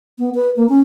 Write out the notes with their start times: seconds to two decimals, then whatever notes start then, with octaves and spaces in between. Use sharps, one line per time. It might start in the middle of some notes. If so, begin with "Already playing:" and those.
0.19 B3
0.35 B4
0.57 A#3
0.69 C#4